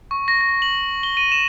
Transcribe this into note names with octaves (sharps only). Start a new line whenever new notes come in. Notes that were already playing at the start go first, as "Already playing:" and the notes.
C#6
A#6
A#6
F#7
G7
D#7
E7